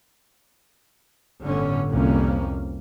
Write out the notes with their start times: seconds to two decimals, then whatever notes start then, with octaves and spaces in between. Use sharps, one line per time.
1.43 G1 A2 D3 C#4
1.90 C2 F2 C3 A#3 C#4